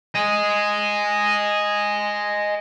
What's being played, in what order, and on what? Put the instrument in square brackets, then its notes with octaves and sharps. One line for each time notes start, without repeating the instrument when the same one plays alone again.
[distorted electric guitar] D#5 G#5